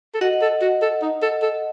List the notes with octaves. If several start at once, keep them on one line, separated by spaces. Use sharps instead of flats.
A4
F#4 D#5 F#5
A4
F#4
A4
D#4
A4
A4